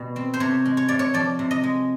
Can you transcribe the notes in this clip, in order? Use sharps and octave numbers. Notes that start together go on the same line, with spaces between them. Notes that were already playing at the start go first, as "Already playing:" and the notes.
Already playing: B2 G3
C4
C5
C3 C#5
G#3
C#5
C3 D5
C#5
F3 D5
C3
D#5
G#3